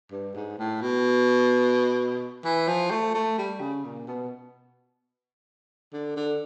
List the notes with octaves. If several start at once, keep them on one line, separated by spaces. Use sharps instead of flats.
G2
G#2
A2
B2
E3
F3
A3
A3
G3
C#3
A#2
B2
D3
D3